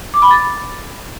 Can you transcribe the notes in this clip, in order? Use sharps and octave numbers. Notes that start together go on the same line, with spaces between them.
D6
B5
A6